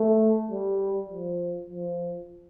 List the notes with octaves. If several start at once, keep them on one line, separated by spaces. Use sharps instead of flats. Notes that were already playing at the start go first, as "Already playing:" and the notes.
Already playing: A3
G3
F3
F3